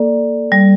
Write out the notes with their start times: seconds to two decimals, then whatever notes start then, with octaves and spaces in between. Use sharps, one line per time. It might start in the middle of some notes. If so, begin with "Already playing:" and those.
Already playing: A#3 A4 D5
0.52 G3